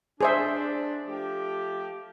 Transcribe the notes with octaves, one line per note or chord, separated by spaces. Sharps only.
D4 G#4 C5 E5
F3 A3 G4